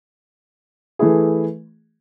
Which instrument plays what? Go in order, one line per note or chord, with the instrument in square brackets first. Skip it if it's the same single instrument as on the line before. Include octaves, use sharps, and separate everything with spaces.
[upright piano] E3 A3 E4 G#4